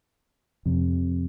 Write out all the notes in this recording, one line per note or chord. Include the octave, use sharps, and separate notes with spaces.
F2 C3